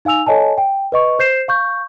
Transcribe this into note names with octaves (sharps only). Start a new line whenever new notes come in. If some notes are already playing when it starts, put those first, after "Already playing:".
D#4 F5 G#5 E6 F7
A4 C#5 D#5 G#5 A5
G5
B4 D#5 C#6
C5 G6 C7 E7
F5 C#6 G6